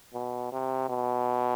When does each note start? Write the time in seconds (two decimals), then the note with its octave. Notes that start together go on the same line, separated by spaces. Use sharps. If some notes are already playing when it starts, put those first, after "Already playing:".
0.14 B2
0.52 C3
0.89 B2